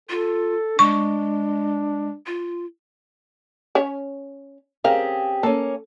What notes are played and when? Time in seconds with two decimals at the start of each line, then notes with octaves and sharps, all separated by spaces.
0.10 F4 A4
0.79 G#3 D4 C#6
2.27 F4
3.75 C#4 C#5
4.84 C#3 C4 G4 G#4 A#4 F5
5.43 A#3 C#4 A4